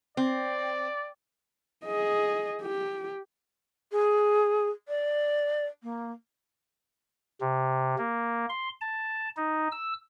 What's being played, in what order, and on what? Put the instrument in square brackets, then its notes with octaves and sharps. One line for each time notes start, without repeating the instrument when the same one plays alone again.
[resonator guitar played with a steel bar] C4 [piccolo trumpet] D5
[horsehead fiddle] G#4 D#5
G4
[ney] G#4
D5
A#3
[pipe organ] C3
A#3
C6
A5
D#4
E6